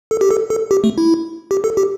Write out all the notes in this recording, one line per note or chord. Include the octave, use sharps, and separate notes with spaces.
A4
G4
A4
A4
G4
A3
E4
G4
A4
G4